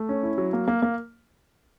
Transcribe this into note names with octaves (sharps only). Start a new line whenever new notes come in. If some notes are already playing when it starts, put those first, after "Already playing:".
Already playing: A3
C#4
E4
F#3
A#3
A#3
A#3